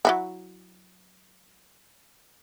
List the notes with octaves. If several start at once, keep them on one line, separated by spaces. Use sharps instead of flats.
F#3 E4 F#4